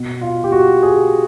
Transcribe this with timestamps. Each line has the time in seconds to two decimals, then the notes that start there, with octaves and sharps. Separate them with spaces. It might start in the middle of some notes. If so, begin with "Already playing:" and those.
Already playing: B2
0.21 F4
0.44 G4
0.52 F#4
0.83 G#4